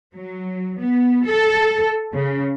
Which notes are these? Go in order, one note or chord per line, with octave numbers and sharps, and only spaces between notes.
F#3
B3
A4
C#3